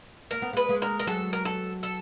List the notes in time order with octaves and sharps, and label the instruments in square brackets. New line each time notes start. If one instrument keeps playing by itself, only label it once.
[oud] A#3 [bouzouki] A#4
[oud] B3
[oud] G#3 A#3 [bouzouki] B4
[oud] G#3 A#3
[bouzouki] A#4
A#4
[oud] F#3 G#3 [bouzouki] A4
[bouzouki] A#4
A4
A4